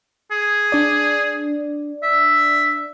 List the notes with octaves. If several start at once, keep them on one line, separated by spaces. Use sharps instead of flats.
G#4
D4 D5
E5